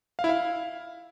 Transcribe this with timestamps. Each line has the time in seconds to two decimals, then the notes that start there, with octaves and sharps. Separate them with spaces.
0.19 F5
0.24 E4
0.29 F5